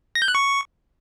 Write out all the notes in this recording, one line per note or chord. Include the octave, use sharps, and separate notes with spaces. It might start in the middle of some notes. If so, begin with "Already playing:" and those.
A#6
G6
F#6
C#6